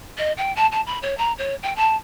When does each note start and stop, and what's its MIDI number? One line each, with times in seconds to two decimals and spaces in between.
0.18 0.32 75
0.37 0.54 79
0.56 0.66 81
0.72 0.81 81
0.86 0.98 83
1.02 1.17 73
1.18 1.32 82
1.38 1.55 73
1.63 1.75 79
1.76 1.96 81